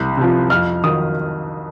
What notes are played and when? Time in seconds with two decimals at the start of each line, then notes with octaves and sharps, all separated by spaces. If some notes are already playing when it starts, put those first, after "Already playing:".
Already playing: C2
0.17 C3 F3
0.50 F2 F6
0.83 D#3 F#3 D#6